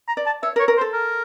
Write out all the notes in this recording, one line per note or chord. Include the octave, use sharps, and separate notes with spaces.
A#5
D5
A5
C#5 E5
A#4
C#5
A#4
C5
A4
A#4